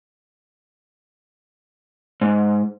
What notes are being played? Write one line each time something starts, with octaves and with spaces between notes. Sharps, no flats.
G#2